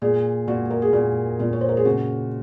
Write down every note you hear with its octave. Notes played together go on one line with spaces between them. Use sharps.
A#2 G#4
A#2 F#4
A#4
G#4
A#2 F#4
A#2 F4
C#5
C5
A#4
G#4
C#3 F#4